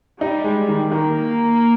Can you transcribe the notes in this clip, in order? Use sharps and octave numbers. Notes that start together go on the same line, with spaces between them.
G3 D#4
G#3
D#3
D#3 A#3